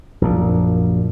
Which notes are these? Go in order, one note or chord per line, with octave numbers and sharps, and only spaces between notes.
A#1 F#2 A#2